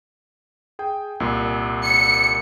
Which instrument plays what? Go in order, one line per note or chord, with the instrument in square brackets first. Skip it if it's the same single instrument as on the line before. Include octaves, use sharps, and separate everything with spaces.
[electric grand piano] G#4 G5
C2 A#2
[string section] C#7